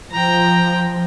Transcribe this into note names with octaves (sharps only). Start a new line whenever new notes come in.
F3 G5 A#5